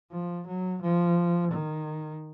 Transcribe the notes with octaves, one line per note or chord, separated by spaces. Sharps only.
F3
F#3
F3
D#3